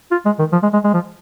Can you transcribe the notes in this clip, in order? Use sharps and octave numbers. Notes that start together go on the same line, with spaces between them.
F4
G#3
D#3
F3
G#3
G#3
G#3
F3